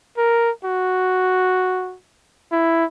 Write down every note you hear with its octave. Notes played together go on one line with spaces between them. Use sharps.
A#4
F#4
E4